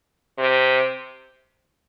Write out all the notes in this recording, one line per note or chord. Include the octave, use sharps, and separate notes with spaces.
C3